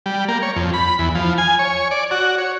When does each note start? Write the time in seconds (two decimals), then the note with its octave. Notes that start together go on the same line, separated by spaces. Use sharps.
0.06 G3
0.28 A#3
0.43 C#5
0.56 F2
0.74 B5
0.99 E2
1.15 F3
1.38 G#5
1.59 C#5
1.91 D5
2.11 F#4
2.38 C#5